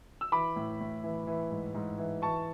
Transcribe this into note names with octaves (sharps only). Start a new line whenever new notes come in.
E6
E3 B5 D6
A2
A2
E3
E3
G#2
G#2
E3
E3 A5 C#6